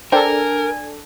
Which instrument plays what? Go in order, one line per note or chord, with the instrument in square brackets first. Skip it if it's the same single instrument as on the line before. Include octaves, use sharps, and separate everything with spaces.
[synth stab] D4 A4 [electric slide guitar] A#4 [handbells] C5 G5 [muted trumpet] G#5